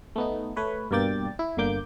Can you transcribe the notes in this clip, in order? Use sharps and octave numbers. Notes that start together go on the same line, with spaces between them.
A3 B3 D#4
A3 B4 C#5
G2 B2 A#3 D5 G5 A6
E4
G1 D3 A#3 D6 G6